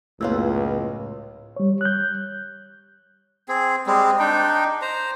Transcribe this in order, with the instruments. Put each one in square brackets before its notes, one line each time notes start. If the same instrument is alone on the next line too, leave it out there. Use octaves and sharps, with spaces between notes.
[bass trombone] C#2 [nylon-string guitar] F#2 A#3 B3 [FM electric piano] A2 F4 [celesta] C#5 E6
[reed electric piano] G3 C#5
F#6 G6
[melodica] C4 G#4
G3 G#3 C4
D4 D#4 G5
C5 A#5